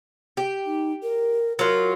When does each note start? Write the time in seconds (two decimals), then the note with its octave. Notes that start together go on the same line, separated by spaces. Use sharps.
0.37 G4
0.66 D#4
1.03 A#4
1.59 F#3 F4 A#4